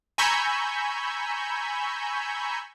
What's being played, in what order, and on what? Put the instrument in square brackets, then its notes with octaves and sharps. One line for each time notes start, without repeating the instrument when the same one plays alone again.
[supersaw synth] G#5 A#5 B5 C#6 E6 G6